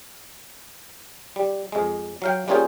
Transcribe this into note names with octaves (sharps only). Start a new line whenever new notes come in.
G3
F2 G#3
F#3 F5 G5
G3 A#3 C#4 F4 G#4 C5